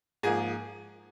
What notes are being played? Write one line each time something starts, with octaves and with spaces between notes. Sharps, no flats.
G#2 F3 A#3 G#4